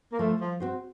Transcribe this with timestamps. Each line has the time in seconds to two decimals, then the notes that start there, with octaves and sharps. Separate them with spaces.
0.13 A#3
0.19 F3 A3
0.40 F3
0.60 C4 F#4 C5